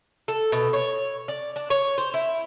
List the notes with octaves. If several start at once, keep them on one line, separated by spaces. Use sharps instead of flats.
A4
B2
C#5
D5
D4
C#5
C5
E4